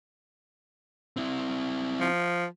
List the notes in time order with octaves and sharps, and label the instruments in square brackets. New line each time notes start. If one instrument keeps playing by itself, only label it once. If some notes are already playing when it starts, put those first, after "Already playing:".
[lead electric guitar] C4 E4
[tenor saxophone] F3